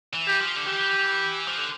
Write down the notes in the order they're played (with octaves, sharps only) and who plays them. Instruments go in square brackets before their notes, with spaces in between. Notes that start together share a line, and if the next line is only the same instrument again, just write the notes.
[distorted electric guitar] E3
[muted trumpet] G4
[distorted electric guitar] F3
D3
[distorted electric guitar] E3 [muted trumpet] G4
[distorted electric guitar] F3
D3